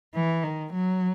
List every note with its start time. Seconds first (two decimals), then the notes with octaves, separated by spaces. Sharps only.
0.15 E3
0.44 D#3
0.73 F#3